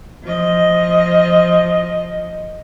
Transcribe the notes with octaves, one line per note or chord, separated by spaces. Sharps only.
F3 D#5